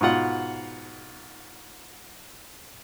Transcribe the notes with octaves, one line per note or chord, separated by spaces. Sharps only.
G#2 B2 F4 F#5